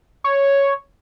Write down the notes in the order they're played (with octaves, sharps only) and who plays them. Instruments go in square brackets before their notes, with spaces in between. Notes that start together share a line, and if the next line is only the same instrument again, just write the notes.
[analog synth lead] C#5